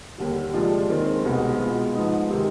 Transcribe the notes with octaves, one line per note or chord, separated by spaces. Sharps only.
D#2 D3 G3
C3 F3 G#3 D4 F4
D#2 D#3 G#3 C4
C2 B2 G#3 B3
B2 G#3 B3 F4
G#2 F3 B3 D#4
C3 D#3 G#3